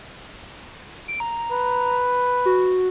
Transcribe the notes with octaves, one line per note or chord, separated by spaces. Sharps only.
D7
A#5
B4
F#4